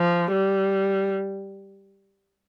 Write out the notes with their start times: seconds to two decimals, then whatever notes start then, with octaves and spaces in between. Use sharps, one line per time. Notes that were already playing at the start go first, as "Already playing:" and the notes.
Already playing: F3
0.32 G3